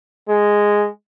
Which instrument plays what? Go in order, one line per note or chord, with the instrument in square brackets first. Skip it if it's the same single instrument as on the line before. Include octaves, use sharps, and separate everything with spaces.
[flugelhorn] G#3